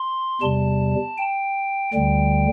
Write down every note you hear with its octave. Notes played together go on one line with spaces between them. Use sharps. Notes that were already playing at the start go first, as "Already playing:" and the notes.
Already playing: C6
E2 C3 G3 A5
G5
D2 D3 G3 G5